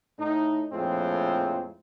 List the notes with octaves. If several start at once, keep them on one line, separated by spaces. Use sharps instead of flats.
A2 D#4
A#1 F2 A2 G#3 C4 F4